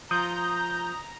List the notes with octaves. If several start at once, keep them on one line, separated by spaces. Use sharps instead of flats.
F3 A#5 D#6 G6